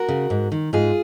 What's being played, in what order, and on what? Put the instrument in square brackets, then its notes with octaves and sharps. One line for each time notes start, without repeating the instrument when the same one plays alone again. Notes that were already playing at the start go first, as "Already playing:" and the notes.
Already playing: [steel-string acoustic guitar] F#4 A#4
C#3
G#2
D#3
G#2 F4 G#4